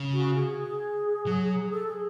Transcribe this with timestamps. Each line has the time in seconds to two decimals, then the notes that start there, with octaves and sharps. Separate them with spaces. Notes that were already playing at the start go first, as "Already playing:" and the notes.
Already playing: C#3
0.13 F#4
0.35 G#4
1.27 F#3
1.72 A4
1.87 G#4